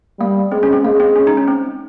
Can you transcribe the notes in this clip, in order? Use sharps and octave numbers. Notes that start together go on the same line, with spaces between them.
G3 A#3
G#3 C4
C#4
C4
G#3 A#3
C4
C#4
D#4
C#4
C4